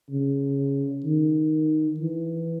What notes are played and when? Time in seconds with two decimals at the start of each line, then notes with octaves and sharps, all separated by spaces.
0.11 C#3
1.05 D#3
2.00 E3